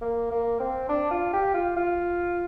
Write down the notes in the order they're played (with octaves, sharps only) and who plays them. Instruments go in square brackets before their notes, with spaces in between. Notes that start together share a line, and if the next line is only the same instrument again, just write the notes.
[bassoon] A#3
A#3
C4
D4
F4
G4
F4
F4